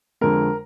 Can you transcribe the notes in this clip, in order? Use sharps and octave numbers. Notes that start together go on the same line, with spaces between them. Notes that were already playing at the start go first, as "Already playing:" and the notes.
F2 D3 G#3 A#4